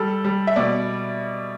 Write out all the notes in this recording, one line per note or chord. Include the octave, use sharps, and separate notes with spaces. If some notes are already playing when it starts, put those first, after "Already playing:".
Already playing: G3 A4
G3
E5
B2 D5